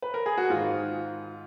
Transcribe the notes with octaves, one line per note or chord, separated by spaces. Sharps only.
B4
A#4
G#4
F#4
G#2 D#3 F4